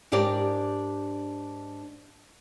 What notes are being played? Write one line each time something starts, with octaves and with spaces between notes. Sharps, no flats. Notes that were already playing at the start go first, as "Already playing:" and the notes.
G#2 D4 G4 A#4 D5